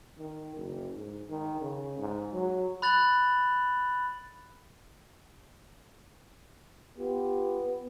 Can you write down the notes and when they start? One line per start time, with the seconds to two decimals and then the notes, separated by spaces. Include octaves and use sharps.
0.18 D#3
0.56 F#1
0.96 G#2
1.29 D#3
1.61 C#3
1.98 G#2
2.33 F#3
2.82 B5 F#6 A6 F7 F#7
6.98 B3 F4 G4